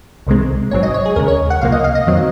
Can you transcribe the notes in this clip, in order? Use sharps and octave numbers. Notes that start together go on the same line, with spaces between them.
C2 C3 D#3 G#3 C4
G#1 G#2 F#3 C4 C#5
D#5
C#5
G#4
D#2 C#3 G#3 A#4
C#5
F#5
C#2 C3 F3 A#3 F5
D#5
F5
D#5
F2 D#3 F#3 C4